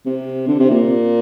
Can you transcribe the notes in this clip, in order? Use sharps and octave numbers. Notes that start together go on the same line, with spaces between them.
C3
D3
C3
A#2